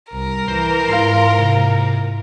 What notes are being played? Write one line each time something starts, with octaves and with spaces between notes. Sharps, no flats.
C2 A#4
E3 C5
G#2 E4 F4 F5 C6
C2 C3